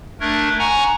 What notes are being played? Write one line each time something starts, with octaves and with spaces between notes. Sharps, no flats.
A3 D4 A#4 G#6
F#5 G#5 A#5 C#6